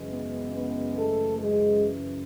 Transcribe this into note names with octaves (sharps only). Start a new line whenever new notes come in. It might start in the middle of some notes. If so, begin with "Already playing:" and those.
Already playing: F#2 C#3 E3 G#3
B3
B3
A3 A4
G#3 G#4